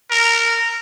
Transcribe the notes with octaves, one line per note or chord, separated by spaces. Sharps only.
A#4